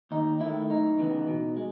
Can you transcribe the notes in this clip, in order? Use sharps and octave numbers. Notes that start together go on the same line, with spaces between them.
D#2 D#4
D#3 A3 E4
F#2 D#4
C#3 E3 B3
B2
G#3